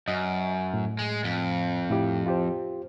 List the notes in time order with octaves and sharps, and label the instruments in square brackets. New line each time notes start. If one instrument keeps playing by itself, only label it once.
[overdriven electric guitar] F#2 [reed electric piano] D#5
[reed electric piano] A2
[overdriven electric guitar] G#3
F2
[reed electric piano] A2 E4 G4
F4 G4 C5